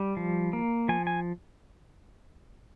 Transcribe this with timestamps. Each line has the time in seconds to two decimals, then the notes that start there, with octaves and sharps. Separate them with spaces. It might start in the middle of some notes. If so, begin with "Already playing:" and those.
Already playing: G3 G5
0.17 F3
0.53 A#3
0.89 F3 G#5
1.07 G#5